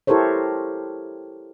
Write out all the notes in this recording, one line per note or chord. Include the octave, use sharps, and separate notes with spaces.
E4 G4 A4 A#4 C5 C#5